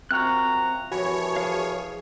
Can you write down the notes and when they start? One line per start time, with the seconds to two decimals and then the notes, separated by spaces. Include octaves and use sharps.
0.11 F#2 F3 C4 G5 A#5 C#6 F6 F#6
0.92 C2 E3 F3 F#4 C#5 G#5 B5
1.36 G#4 F5